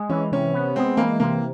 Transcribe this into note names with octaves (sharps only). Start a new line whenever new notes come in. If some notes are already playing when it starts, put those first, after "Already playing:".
Already playing: G#3
E3 C#4
C3 C#4
B3
G#3 C4
E3 A#3
C3 A#3